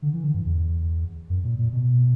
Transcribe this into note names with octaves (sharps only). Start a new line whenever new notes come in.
D3
E3
D3
G2
E2
F#2
A#2
A#2
B2